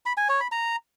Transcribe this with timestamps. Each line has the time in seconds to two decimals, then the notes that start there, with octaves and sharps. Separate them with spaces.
0.06 B5
0.17 G#5
0.29 C#5
0.40 B5
0.52 A#5